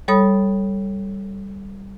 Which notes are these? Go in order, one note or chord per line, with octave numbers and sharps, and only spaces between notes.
G3 A4 C#5 B5 D#6